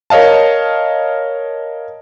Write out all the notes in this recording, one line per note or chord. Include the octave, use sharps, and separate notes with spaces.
A#4 C#5 D#5 F5 A5